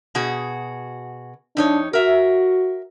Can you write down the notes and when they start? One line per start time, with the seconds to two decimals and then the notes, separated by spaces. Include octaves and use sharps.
0.15 B2 F#4 G#4
1.57 F2 D4 D#4 C#5
1.93 F#4 A#4 E5